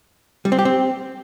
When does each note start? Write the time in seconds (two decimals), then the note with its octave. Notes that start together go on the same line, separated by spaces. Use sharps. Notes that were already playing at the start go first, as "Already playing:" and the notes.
0.45 G3
0.52 C4
0.59 G4
0.65 C4